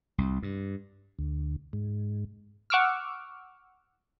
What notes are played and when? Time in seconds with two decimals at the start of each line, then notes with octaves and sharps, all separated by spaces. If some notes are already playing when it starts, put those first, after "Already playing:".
0.18 C2
0.43 G2
1.19 D2
1.73 G#2
2.70 F#5 C#6 D6 E6 F6